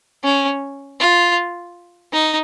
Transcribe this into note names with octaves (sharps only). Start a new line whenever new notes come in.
C#4
F4
D#4